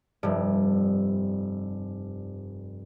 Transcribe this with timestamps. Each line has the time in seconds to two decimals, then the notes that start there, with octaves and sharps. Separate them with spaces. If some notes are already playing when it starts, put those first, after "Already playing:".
0.23 F1 G2